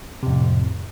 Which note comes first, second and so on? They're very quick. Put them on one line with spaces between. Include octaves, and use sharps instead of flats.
C3 F2 A2